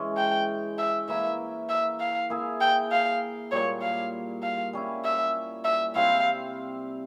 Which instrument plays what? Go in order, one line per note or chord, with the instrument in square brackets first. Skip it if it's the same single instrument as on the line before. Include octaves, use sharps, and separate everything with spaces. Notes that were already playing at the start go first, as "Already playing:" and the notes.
Already playing: [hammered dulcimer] E3 G#3 C#4 E4
[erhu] G5
E5
[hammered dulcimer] E3 A#3 E4 A#4 [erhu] E5
[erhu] E5
F5
[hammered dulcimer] A#3 E4 G#4 E5
[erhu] G5
F5
[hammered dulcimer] A#2 G3 A#3 [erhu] C#5
[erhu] F5
F5
[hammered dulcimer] G3 C#4 E4
[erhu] E5
E5
[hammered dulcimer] C3 G3 C4 E4 [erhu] F5